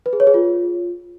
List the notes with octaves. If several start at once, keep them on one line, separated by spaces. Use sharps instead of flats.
B4
G#4
C#5
G#4
F4